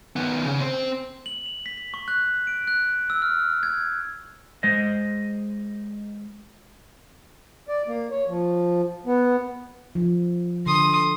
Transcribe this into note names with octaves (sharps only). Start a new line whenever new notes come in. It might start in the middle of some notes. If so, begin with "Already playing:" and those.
D#3 B3
C#3
C4 C5
F#7
F7
B6
B6
C#6
F#6
D7
F#6
E6
F6
G#6
G#3 C5 D#5
D5
A#3
C#5
F3
B3
F3
D3 C6 D#6